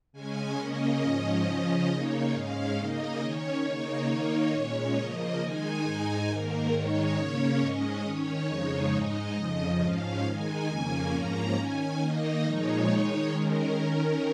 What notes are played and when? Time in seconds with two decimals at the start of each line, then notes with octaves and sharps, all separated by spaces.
0.12 C#3 G#3 C#4 G#5
0.56 C#3 A#3 C#4 D#5
1.00 G#2 F3 C#4
1.44 C#3 F3 C#4
1.88 C#3 A#3 D#4 C#5
2.32 G#2 G#3 C#4 F5
2.76 C#3 A#3 D#4 D#5
3.19 D#3 C#4 C#5
3.63 C#3 A#3 D#4
4.08 D#3 A#3 D#4
4.52 A#2 G#3 C#4
4.95 C#3 F3 A#3 D#5
5.39 D#3 G#3 D#4 G#5
5.83 G#2 G#3 D#4 G#5
6.27 G#2 D#3 A#3 A#4
6.71 G#2 D#3 G#3 D#4 C#5
7.16 C#3 A#3 C#4
7.59 G#2 G#3 C#4 D#5
8.03 D#3 C#4 C#5
8.47 F2 C#3 F3 G#3 D#4 C#5
8.92 G#2 G#3 D#4 D#5
9.35 F2 C#3 F3
9.79 G#2 F3 C#4 F5
10.23 D#3 G#3 D#4 G#5
10.67 F2 C#3 A#3 C#4 G#5
11.11 G#2 F3 A#3 C#4 A#5
11.55 D#3 C#4 G#5
11.99 D#3 A#3 D#4 D#5
12.43 A#2 F3 G#3 D#4 C#5
12.87 D#3 G#3 D#4 C#5
13.31 D#3 G#3 C#4 A#4
13.75 D#3 C#4